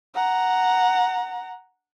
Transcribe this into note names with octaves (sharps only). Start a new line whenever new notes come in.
F#5 A#5